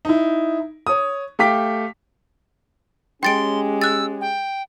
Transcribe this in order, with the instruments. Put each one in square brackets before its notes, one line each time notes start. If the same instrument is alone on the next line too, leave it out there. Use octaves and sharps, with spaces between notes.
[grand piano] D#4 E4
C#5 D#6
A3 G4 F5 G5 D6 B6
[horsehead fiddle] G#3 [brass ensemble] C#4 G4 [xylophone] G5 A6 D7 [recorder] C6
[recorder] E6 [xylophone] F#6 A6
[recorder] G5